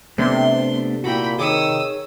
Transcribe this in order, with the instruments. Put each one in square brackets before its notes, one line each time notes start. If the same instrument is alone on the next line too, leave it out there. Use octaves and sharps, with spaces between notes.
[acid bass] C3 [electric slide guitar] A3 B3 D4 [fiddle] C6
[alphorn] A#2 [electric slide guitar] E4 F#4 [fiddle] G5 B5
[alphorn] D#3 [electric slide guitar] G#4 C#5 [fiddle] D#6 E6